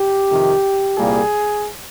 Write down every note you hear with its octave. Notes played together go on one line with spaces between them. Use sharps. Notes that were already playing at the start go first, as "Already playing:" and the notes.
Already playing: G4
F2 C3 D#3
C2 A#2 G3 A#3 G#4